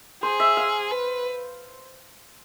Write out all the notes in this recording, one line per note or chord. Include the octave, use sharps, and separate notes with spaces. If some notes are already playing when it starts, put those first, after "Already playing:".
G#4 C5
E5
F5
B4